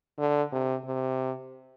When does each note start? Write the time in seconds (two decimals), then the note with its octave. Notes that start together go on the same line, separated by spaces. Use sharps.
0.19 D3
0.52 C3
0.86 C3